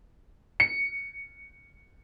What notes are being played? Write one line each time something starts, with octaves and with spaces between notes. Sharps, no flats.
C#7